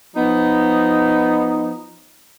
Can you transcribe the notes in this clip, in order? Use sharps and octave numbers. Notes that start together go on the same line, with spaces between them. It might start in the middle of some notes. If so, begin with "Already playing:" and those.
F3 B3 D#4